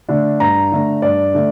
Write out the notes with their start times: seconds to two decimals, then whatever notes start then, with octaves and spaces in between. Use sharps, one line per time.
0.09 D3 A3 D4
0.40 G2 A#5
0.72 D3 A3 D4
1.02 G2 D5
1.34 D3 A3